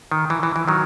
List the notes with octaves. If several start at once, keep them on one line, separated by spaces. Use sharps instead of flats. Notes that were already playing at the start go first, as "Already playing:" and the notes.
D#3
E3
E3
E3
D#3 F#3